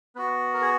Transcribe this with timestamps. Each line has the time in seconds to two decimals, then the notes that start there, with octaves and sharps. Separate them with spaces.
0.15 B3 F#4 B4
0.54 A#4
0.62 G#4